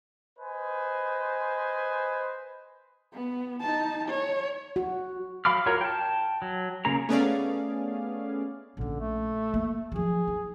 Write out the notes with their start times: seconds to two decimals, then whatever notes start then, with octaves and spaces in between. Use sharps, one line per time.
0.39 B4 C5 D#5 G#5
3.13 B3
3.60 D#4 A5
4.08 C#5
4.76 F#4
5.45 F#3 F5 B5 D6 F6
5.66 F4 F#4 A#4 C#5 A#5
5.81 G5 A5
6.42 F#3
6.85 C#3 A#3 G#4 A#5
7.09 A3 B3 C#4 G#4 D5 F5
8.77 A#1 D3 C#4
9.00 A3
9.54 A#3
9.92 F3 F#3 G#4
10.28 D#4